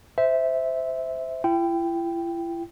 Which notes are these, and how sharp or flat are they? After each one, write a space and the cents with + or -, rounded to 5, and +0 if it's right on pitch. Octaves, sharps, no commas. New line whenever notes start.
C5 -15 E5 -10
E4 +40 G5 +0